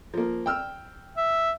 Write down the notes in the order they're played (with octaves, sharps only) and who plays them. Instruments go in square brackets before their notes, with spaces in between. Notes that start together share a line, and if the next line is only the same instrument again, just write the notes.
[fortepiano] F3 A#3
G5 E6 F6
[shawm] E5